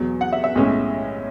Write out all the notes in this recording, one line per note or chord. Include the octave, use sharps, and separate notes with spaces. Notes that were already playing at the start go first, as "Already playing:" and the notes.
Already playing: E2 B2 F#3
F#5
E5
E5
B1 A2 G#3 C#4